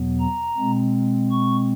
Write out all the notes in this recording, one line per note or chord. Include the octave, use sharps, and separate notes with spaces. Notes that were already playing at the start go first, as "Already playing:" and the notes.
Already playing: E2 B2 F#3 B3
A#5
B2 G#3 C4
C#6